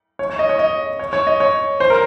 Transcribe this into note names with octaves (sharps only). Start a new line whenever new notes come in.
C#5
C#5
D#5
C#5
D#5
C#5
C#5
D#5
C#5
C5
A#4